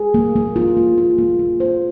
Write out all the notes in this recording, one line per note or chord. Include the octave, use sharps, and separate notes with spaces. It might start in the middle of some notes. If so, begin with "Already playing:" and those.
Already playing: G#4
A#3
A#3
F4
A#3
F4
A#3
A#3
C5